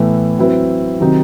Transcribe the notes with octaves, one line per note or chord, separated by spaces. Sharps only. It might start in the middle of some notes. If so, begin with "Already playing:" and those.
Already playing: A2 E3 B3 E4 A4
F#3 C4 E4 B4
C3 D#3 F#3 C4 D#4